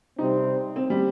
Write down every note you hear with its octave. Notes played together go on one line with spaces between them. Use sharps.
C3 G3 C4 D#4
C4
G3